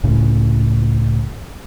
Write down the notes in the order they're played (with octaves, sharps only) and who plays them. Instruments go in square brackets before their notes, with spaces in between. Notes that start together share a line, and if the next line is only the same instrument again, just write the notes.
[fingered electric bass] C#2 A2 C#3